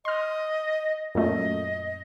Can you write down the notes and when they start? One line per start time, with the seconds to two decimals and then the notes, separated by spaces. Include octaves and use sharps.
0.05 D#5 C6 F6
1.15 F#2 A#2 A3 D#5